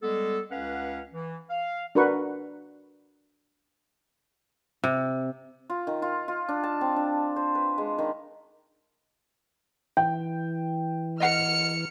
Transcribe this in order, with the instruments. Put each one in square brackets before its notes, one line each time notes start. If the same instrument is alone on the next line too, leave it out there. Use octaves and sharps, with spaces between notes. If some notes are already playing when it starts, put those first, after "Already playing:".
[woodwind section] G3 G#3 B3 A4
C#2 C#4 B4 F5 F#5
E3
F5
[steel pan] D4 F#4 A#4 B4 F#5 C#6
[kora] C3
[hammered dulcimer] F4
D#3
F4
F4
D4
A5
C4
D4
C5
B4
G#3
D#3
[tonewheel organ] E3 [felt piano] G5
[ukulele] D#5 F#5 [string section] F6 C#7